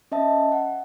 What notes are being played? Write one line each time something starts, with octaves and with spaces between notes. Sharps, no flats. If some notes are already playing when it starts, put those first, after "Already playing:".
C#4 D#5 E5 A5
F#5